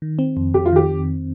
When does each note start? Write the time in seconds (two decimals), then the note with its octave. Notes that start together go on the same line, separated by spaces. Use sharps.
0.02 D#3
0.19 C4
0.37 F2
0.54 F2 G4
0.66 F4
0.73 D#3 G4